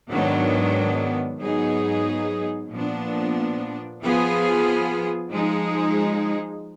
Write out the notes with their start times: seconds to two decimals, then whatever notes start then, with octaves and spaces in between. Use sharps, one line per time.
0.10 G#2 D#3 F#3 B3 D4
1.40 G#2 F#3 B3 D#4 G#4
2.70 A#2 F3 B3 D4
4.01 F3 B3 F4 G#4
5.31 F3 G#3 D#4 G#4